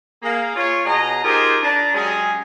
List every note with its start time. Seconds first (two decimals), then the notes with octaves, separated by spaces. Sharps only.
0.23 A#3 G#4 F5
0.56 F4 C#5
0.85 B2 G#4 D#5 A#5
1.24 D#4 F4 G4 G#4 A#4 C5
1.63 D4 A#5
1.95 F#3 G#3 C#4 G4 G#4